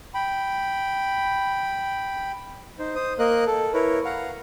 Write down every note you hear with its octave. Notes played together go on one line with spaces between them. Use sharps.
G5 B5
D#4 C5
C5 D#6
A#3 A#4 D#5 F#6
A4
E4 A#4 B4 C#5
F5 F#5 A#5